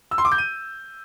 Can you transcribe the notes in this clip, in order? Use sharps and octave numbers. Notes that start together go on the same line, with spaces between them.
E6
C6
D6
G6
D#7